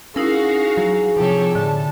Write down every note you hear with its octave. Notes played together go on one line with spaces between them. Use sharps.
C#4 D#4 E4 F#4 G#4 A#4 F5 A#6
F#3
C3 F3 G4 A4 C#5
A2 D3 A5